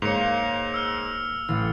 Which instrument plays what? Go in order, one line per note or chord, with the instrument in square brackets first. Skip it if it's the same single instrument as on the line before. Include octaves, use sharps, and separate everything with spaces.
[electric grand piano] G#2 [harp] A#3 C#5 [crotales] C#7 F7
[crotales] E6 F6
[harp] A1 A3